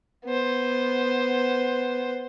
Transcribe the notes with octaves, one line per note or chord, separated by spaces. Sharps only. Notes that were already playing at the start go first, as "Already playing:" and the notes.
B3 C5